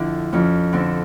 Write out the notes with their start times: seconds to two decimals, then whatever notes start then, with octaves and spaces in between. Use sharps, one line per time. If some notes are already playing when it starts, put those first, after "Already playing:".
Already playing: F2 D3 D4 E4
0.33 F2 C#4
0.73 D3 C4